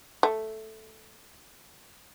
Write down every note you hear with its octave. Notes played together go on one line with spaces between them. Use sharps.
A3